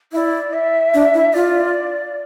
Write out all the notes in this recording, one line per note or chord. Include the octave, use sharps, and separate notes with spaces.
E4 D5 E5
E5
D4
E4
F4 D5